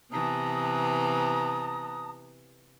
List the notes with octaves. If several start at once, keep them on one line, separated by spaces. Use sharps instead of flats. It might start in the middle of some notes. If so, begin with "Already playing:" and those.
C3 E3 B3 A5 A#5 D#6